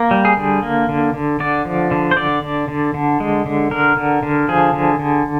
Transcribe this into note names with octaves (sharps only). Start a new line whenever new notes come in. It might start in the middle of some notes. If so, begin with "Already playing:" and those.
Already playing: A#3
G3
G#4
D3
A#3
D3
D3
D3 D5
F3
D3
C5
D3 D5
D3
D3
D3
G#3
D3
D3 A#4
D3
D3
F3 G#4
D3
D3